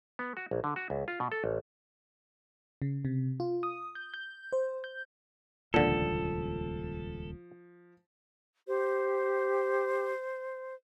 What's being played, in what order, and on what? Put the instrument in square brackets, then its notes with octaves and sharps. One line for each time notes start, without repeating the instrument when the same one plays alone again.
[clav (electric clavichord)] B3
F#4
A#1
D3
F#4
C#2
F4
B2
A4
A1
[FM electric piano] C#3
C3
F4
D#6
G6
G6
C5
G6
[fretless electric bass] D#1 C#2 [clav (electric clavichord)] A#2 D3 [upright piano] F3 [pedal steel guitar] A4
[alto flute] G4 [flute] C5